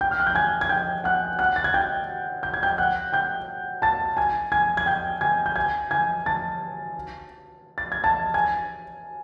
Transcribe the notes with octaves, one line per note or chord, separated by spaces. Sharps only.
G5 G6
F6
F#6
G6
G#5 G#6
G#6
G5 G6
F#5 F#6
F#5 F#6
A6
G#6
G5 G6
G6
G#6
G5 G6
F#5 F#6
G5 G6
A5 A6
G#5 G#6
G#5 G#6
G#6
G5 G6
G#5 G#6
G6
G#5 G#6
G#5 G#6
A5 A6
A6
G#6
A5 A6
G#5 G#6